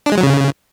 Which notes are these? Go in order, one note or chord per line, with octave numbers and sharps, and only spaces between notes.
D4
G#3
F#3
C#3